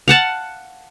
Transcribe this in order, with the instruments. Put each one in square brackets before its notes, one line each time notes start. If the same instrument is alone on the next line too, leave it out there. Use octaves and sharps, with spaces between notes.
[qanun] F5 F#5 A5